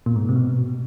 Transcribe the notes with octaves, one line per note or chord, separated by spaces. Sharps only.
A#2
G#2
C3
B2